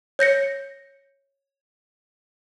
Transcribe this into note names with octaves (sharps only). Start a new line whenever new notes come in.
C#5 G6 A#6 C#7